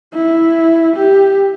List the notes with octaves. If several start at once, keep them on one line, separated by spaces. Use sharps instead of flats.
E4
G4